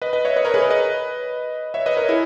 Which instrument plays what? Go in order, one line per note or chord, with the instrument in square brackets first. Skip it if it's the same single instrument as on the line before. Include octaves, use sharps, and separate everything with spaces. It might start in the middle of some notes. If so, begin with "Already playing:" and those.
[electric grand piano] B4 D#5
B4 D#5
C#5 E5
B4 D#5
A#4 C#5
G#4 B4
A#4 C#5
B4 D#5
C#5 E5
B4 D#5
A#4 C#5
E4 G#4